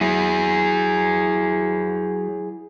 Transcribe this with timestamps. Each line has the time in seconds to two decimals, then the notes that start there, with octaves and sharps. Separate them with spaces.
0.01 F#3 E4 G#4